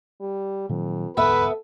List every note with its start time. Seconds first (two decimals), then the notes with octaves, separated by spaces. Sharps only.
0.21 G3
0.69 F2 A#2 D#3 F#3
1.17 E1 D2 G#2 B3 A4 B4 E5